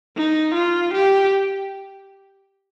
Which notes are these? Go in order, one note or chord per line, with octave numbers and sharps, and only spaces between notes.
D#4
F4
G4